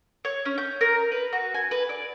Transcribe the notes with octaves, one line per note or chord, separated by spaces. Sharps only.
C#5
C#4
G6
A#4
B4
F#4
G#5
B4
D5